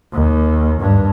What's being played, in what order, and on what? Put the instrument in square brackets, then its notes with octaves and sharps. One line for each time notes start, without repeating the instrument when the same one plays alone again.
[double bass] D#2
G2